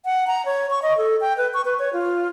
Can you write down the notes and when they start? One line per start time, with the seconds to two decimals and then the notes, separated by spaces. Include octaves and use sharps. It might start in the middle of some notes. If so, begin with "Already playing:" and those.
0.05 F#5
0.27 A#5
0.45 C#5
0.70 C#6
0.82 D#5
0.98 A4
1.21 G5
1.37 B4
1.54 C#6
1.65 B4
1.79 C#5
1.93 F4